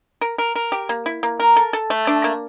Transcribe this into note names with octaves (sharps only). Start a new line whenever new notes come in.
A#4
A#4
A#4
G4
A#3
E4
A#3
A#4
A4
A4
A3
D4
A#3